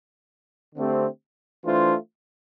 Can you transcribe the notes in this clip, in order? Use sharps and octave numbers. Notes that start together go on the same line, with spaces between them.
D3 A3 C4 G4
E3 A3 D4 F4 C5